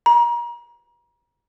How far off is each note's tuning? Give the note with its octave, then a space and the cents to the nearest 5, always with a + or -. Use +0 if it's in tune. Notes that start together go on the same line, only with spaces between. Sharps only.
A#5 +35